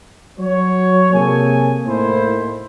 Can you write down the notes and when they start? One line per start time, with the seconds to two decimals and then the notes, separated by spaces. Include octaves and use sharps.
0.40 F#3 C#5
1.14 C3 A#3 G#4 A4 G#5
1.87 A2 A#3 D#4 E4 C5